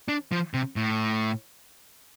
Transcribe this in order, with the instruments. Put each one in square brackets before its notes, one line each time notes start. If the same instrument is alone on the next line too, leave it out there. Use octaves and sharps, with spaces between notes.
[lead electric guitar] D4
F3
C3
A2